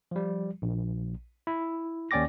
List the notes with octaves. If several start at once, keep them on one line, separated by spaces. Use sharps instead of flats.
F3 G3
A#1
E4
D#2 C#4 D5 G5 D6 A#6